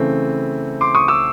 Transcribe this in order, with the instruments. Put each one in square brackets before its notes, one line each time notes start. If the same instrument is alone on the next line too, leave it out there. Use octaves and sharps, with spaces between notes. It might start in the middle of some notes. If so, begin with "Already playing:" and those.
Already playing: [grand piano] C#3 E3 A3 C4
C6 D6
C#6 D#6
D6 E6